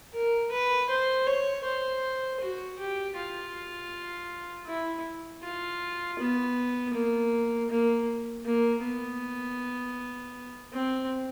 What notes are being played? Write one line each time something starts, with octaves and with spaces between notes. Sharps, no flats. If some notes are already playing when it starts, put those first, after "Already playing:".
A#4
B4
C5
C#5
C5
F#4
G4
F4
E4
F4
B3
A#3
A#3
A#3
B3
C4